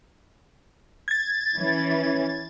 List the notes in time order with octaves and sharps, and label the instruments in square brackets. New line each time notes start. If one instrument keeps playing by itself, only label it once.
[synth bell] G#6 A6
[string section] E3 C#4